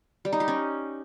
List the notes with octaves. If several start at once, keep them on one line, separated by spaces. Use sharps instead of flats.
G3
D#4
G4
C#4